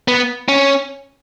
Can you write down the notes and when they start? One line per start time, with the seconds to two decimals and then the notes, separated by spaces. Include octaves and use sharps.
0.08 B3
0.48 C#4